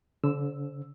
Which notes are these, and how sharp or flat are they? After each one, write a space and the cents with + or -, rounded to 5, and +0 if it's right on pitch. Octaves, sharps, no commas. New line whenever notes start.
D3 -40 C5 +0 E6 +0